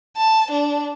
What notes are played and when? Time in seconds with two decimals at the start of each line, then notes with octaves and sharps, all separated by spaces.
0.17 A5
0.52 D4